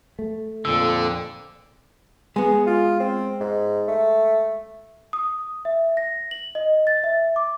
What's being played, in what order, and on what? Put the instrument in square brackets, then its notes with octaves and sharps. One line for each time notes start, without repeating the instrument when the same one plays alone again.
[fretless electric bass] A3
[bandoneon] F2 A#2 [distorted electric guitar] D3 [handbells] E6
[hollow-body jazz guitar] G#3 B3 [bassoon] G#4
[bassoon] F4
C4
G#2
A3
[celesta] D#6
E5
A#6
F#7
D#5
A6
E5
D6